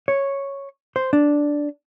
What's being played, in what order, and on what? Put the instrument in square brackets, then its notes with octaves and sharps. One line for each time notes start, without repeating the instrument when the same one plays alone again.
[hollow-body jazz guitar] C#5
C5
D4